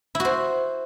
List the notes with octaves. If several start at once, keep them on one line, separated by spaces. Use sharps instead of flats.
E4 F#4 C5